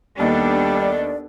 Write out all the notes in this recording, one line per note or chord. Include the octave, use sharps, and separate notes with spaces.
D#2 G3 B3 D4 A4 D5